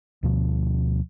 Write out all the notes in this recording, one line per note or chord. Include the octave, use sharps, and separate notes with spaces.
D2 B2 F3